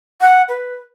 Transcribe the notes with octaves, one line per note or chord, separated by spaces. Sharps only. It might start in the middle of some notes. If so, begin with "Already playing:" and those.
F#5
B4